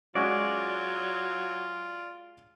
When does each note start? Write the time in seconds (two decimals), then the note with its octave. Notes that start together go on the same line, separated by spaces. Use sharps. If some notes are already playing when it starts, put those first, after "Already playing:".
0.15 F#3 G#3 C#4 F4 F#4 D5